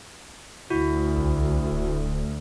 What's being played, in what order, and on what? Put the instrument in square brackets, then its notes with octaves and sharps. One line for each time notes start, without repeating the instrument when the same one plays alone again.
[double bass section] D2 [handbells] E4 F#4
[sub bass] C2
D1